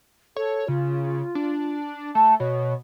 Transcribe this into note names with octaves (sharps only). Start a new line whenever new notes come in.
A4 C#5
C#3 F4
D4
A3 A5
B2 C#5